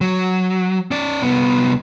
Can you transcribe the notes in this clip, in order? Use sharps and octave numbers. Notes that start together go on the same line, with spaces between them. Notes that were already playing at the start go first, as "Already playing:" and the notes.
F#3
C#4 D5
C2 B3